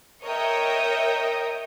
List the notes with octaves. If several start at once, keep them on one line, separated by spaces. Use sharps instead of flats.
A#4 C#5 D#5 E5 G5 D#6